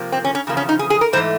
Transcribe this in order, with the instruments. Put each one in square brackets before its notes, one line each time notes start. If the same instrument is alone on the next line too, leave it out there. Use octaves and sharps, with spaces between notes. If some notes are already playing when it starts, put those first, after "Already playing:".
Already playing: [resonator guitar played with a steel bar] C3 F3 A#3
C4
C#4
C#4
E2 C#3 F3 A#3
C#4
D#4
G#4
G#4
A#4
G#2 E3 A3 C5